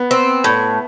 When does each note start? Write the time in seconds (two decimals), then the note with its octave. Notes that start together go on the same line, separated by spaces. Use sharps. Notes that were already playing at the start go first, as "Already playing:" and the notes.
Already playing: B3
0.11 C4
0.44 A2